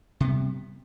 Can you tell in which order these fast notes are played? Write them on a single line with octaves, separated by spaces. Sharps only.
C3 B3 G3